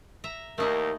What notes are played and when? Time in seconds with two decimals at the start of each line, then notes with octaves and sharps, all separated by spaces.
0.24 E5 A#5
0.58 D#2 A3 D#4 E4 A#4